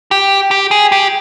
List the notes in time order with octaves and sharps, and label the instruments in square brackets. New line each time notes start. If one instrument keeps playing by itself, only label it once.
[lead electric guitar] G4
G4
G#4
G4